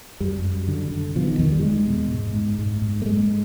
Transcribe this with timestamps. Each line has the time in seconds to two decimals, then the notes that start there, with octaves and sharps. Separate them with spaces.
0.20 F#2 G3
0.45 F#2
0.68 D3
0.91 D3
1.16 B2 F3
1.27 D#3
1.39 E2 D#3
1.52 G3
1.63 E2 G#3
1.87 B2
2.11 G#2
2.35 G#2
2.59 G#2
2.82 G#2
3.02 A3
3.06 G#2 G#3